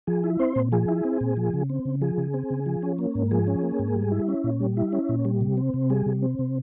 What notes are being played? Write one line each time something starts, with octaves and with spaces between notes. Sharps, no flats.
F3 G#4
E4
C4 C5
A#2
F3 G#4
E4
C4
A#2
F3
C#3
C4
C#3
F3 G#4
C#3
C4
C#3
F3
C#4
A#3
G#2
F3 G#4
C#4
A#3
G#2
G3
E4
C#4
A#2
G3
E4
C#4
A#2
G3
C3
C4
C3
G3 G#4
C3
C4
C3